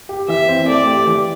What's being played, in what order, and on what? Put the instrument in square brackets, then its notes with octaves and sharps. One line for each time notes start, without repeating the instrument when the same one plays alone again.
[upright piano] G4
[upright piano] E3 [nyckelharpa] E5
[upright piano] C4
[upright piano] A3 [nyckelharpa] D5
[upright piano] G4
E3